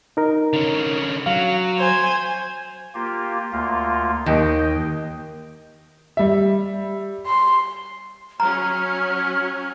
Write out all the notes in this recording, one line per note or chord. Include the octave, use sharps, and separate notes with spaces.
D#4 A#4
D3 C#4
F#3 F5
C5 G#5
A#3 F4 G4
D2 A#3 F4
D#2 D#5 G5
G3 E5
C6
F#3 C#4 A#5 F6